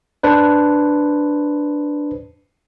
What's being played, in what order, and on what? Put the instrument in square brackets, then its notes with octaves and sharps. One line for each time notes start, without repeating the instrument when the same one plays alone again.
[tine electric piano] D4 B4 C5